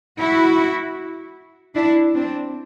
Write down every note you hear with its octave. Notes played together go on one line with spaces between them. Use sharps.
E4 F#4
D4 E4
C4 D4